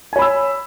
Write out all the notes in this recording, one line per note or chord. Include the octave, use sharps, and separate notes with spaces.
C#5 G#5 B5 E6